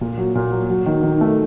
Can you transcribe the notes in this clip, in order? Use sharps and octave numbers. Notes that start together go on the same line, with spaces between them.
A#2
F#3
A#2
F#3
F#3
D#3
D#3
A3